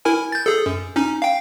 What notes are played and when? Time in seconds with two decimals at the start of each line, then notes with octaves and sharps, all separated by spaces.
0.05 E4 A#4 G#5
0.32 G6 A6
0.46 G#4 A4
0.66 F#2
0.96 C#4 D#4
1.22 F5 G5